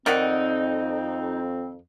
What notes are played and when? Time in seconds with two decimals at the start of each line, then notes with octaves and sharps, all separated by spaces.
0.06 F2 D#3 C4 D#4 D5 D#5 F#5